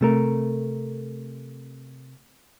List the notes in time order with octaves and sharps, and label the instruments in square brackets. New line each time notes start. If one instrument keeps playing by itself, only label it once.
[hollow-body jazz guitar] C3 A3 A#4